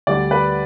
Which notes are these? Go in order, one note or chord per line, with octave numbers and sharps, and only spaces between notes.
D2 D3 G3 D4 D5
B4